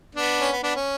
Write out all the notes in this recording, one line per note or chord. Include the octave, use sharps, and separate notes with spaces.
B3 D4
C#4
B3
B3 D4
C#4